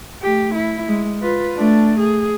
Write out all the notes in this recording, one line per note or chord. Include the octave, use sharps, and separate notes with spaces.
A3 G4
E4
G#3
F4 B4
A3 D4
G#4